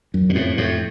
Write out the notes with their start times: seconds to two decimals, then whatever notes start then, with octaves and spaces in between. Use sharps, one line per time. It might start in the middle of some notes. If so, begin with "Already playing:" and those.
0.14 F#2
0.29 A#2
0.35 F2 A2
0.57 F2 A2